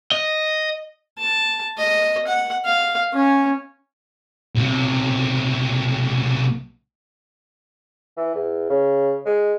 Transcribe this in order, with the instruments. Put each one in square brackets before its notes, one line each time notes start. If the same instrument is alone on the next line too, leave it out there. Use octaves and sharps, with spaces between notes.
[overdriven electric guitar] D#5
[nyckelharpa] A5
D#5
F#5
F5
C#4
[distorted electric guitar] B1 C3
[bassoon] E3
E2
C#3
G#3